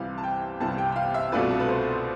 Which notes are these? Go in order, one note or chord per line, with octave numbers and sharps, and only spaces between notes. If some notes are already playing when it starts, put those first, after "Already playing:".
Already playing: C2 C3 E3 G3 F5
A5
G5
C2 C3 E3 G3 A5
G5
G5
F5
E5
C2 B2 A3 D4 F4 B4
A4
B4
C5